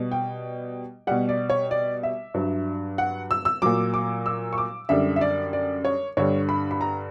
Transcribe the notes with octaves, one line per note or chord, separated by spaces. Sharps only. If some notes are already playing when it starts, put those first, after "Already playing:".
Already playing: B2 G3
G5
B2 G3 F#5
D5
C#5
D5
E5
G2 F#3
F#5
E6
E6
A#2 F#3 D6
D6
E6
C#6
D6
F#2 D3 G3 E5
E5
D5
D5
C#5
G2 D3 G3 C#5
B5
B5
A#5